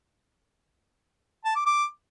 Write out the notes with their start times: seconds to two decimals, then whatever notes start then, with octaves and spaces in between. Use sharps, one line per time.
1.45 A5
1.55 D6
1.66 D6